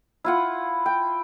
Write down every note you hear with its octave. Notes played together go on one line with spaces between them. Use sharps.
E4 F4 F#5
G5